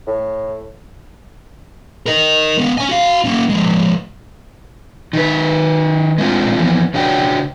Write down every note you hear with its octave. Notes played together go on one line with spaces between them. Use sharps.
A2
A#4 D#5
G#3 B3
C#4 G#5
F#4 F5
A#3 C#4
F3 G#3
D#3 B4
G#3 A3 C4 D4 F4
E3 F3 B3
C#3 D4 F#4 C#5 D5 G5